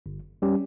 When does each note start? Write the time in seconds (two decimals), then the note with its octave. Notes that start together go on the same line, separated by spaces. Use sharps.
0.06 G1
0.42 G3 C#4 G4